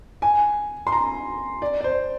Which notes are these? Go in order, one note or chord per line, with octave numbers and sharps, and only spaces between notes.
G#5
C6
A#5
D5
D5
C5